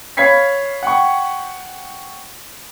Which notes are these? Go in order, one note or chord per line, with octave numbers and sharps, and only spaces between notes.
C#5 F5 B5 G#6 B6 C7
F#5 G5 C#6